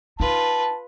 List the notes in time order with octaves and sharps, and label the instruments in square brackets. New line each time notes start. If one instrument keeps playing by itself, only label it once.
[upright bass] D#4 [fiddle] F4 B4 [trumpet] A5